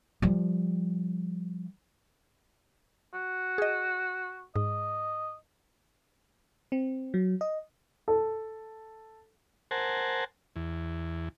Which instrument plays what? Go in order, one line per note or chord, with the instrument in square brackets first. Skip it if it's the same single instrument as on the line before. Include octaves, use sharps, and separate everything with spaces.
[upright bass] F3 G3
[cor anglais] F#4
[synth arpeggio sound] G#4 D#5
[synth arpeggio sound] G#2 [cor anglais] D#5
[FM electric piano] C4
F#3
D#5
[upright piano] A4
[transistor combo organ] A#4 C5 F#5 G#5 A5
E2